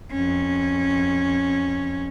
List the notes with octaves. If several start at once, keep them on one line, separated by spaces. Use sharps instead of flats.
F2 C#4